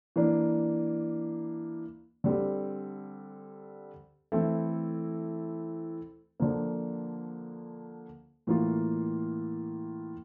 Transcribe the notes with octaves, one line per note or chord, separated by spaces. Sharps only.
E3 A#3 D4
D3 G3 C4
E3 A3 C4 E4 A4
D3 F3 A#3
A2 E3 A#3 F4